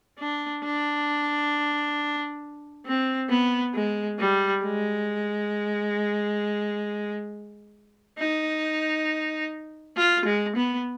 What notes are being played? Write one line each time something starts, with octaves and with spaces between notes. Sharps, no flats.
D4
D4
C4
B3
G#3
G3
G#3
D#4
F4
G#3
B3